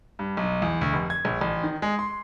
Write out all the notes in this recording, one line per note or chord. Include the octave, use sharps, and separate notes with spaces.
G2
B1
E2
D2
F1
G#6
A#1
A1
D#3
G#3
C6